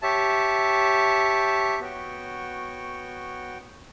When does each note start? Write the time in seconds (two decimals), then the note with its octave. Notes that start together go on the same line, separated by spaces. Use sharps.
0.02 G4 C#5 E5 A5
1.80 B3 F#4 C#5 G5